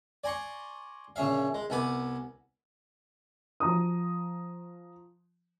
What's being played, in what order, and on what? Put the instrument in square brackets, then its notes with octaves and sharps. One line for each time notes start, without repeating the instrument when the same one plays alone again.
[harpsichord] D5 G#5 A#5 C6 C#6
A#1 C#3 C#4 E5 F5
G#3
C2 B3 G#5 B5 D6
[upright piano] F3 A#5 D#6